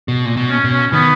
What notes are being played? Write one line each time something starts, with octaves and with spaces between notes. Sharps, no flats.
B2
A#2
B2
C#4
B2
C#4
D#3 B3